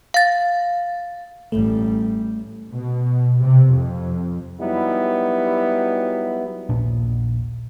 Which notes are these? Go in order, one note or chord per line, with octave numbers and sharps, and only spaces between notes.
F5 A6
A1 G3 A3
B2
C3
F2
F#3 G3 B3 D#4 E4
D#1 A#1 A#2 D4